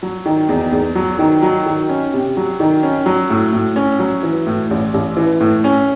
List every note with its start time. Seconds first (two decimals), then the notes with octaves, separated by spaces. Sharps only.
0.03 F#3
0.26 D#3
0.49 E2
0.72 E2
0.95 F#3
1.19 D#3
1.43 F#3
1.66 D#3
1.89 C#4
2.14 C3
2.37 F#3
2.60 D#3
2.83 C#4
3.06 F#3
3.30 A2
3.53 A2
3.76 C#4
3.99 F#3
4.23 E3
4.47 A2
4.71 A1
4.94 A1
5.17 E3
5.41 A2
5.64 C#4